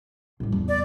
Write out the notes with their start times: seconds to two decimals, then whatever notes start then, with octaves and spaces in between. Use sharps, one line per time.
0.40 A2 G3
0.52 E2
0.68 D5